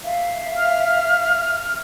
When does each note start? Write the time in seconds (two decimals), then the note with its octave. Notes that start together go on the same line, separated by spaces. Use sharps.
0.05 E5 F5
0.56 F6